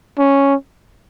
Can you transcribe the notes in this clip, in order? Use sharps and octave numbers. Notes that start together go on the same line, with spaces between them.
C#4